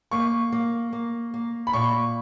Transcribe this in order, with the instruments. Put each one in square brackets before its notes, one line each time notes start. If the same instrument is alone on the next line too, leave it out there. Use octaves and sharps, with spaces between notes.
[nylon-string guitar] A#3 [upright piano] C#6
[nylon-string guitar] A#3
A#3
A#3
[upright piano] B5
[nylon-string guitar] A#2 [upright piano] C#6